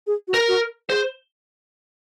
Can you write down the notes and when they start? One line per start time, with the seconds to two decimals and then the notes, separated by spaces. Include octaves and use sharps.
0.07 G#4
0.28 F#4
0.34 A#4
0.48 F#4
0.89 G#4 C5